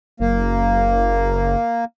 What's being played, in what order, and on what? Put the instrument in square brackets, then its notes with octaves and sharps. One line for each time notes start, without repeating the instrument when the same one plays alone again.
[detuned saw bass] F#1 [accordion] A#3